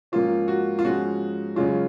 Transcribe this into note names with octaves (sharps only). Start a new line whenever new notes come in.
G#2 F3 A#3 C#4 F4
F#4
F4
G#2 F3 G#3 C#4 F#4
F#2 C#3 G#3 C#4 F4